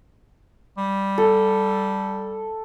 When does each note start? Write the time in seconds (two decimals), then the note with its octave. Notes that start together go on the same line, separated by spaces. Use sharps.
0.78 G3
1.18 A4